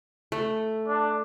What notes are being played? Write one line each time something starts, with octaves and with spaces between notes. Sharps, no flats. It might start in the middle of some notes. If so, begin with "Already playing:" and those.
A3
D4